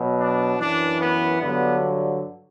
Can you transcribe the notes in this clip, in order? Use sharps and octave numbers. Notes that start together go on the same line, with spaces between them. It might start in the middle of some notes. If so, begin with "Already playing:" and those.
Already playing: B2 F#3
D4
F#2 E3 D4
B3
G2 D3 F#3 B3